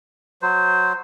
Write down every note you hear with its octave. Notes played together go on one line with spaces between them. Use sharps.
F#3 C5